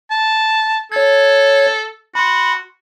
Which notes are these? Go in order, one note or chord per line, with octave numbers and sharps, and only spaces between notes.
A5
A4 C#5 G#6
F#4 B5 C6